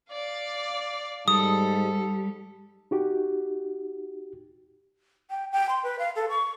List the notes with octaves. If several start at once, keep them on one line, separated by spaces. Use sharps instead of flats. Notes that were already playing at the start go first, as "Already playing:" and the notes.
D5 F5
G#2 G3 A4 D#6
D#4 F#4 G4
G5
G5
C6
B4
F5
A4
C#6